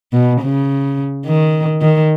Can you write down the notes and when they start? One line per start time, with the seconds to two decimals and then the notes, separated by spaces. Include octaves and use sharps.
0.13 B2
0.41 C#3
1.26 D#3
1.82 D#3